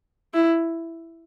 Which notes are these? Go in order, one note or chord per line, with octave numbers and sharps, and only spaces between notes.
E4